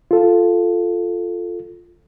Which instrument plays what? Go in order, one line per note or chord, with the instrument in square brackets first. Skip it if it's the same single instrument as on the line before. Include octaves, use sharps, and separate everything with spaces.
[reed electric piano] F4 A4